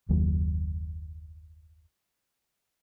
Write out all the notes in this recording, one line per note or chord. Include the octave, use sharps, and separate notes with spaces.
F#1 D#2 F#3 A#3